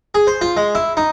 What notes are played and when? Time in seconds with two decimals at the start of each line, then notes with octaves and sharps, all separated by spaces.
0.15 G#4
0.27 C5
0.41 F4
0.57 G#3
0.75 E4
0.97 D#4